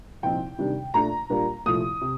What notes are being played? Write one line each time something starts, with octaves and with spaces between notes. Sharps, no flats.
C2 A#2 F3 C4 D#4 G5
C3 D#3 G3 D4
A#2 A3 D4 A#5
A#2 G3 A#3 D4
C2 A#2 F3 A3 D#6
C3